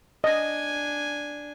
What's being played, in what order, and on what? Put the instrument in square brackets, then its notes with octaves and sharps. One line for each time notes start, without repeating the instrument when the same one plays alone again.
[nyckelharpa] D4 G#5 [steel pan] D#5